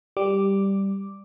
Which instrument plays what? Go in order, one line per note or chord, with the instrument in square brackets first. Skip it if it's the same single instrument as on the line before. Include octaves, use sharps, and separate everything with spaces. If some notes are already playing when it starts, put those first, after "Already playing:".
[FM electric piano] G3 D6